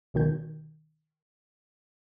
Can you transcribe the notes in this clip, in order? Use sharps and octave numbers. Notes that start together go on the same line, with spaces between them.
C#2 B2 D#3 G6